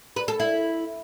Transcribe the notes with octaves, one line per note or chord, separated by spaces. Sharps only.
B4
A4
E4